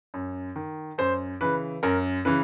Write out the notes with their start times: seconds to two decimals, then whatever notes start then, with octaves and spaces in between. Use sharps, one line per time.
0.14 F#2
0.56 D#3
0.98 F#2 C5
1.41 C#3 E3 B4
1.83 F#2 A#4
2.25 C#3 E3 B4